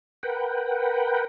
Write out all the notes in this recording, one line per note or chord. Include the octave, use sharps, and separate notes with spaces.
A#4 B4 F#5 G5